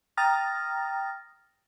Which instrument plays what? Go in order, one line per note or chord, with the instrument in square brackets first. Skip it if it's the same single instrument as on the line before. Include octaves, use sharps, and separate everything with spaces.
[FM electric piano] G5 A#5 D#6 F6 A6 A#6